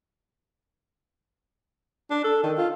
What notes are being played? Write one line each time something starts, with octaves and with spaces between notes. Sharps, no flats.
D4
A4
D#3
F4